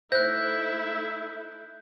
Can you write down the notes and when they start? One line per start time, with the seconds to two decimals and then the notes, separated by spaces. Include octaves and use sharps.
0.12 A3 D#4 E4 C5 E5 F#6 G6